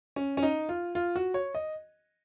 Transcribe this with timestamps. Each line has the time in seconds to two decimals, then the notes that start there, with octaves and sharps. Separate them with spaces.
0.16 C#4
0.37 C#4
0.43 D#4
0.69 F4
0.95 F4
1.16 F#4
1.34 C#5
1.55 D#5